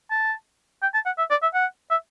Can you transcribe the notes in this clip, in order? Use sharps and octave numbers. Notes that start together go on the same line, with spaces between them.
A5
G5
A5
F#5
E5
D5
E5
F#5
E5